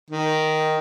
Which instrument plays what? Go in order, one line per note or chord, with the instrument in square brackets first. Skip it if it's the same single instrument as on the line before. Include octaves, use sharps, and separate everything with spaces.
[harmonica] D#3